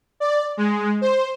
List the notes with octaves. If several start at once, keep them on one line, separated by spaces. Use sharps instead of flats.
D5
G#3
C5